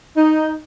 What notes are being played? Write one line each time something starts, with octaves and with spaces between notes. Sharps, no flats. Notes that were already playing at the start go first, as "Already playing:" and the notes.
D#4